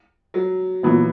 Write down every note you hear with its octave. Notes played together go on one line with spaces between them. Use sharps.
F#3
A#2 E3 F#3 B3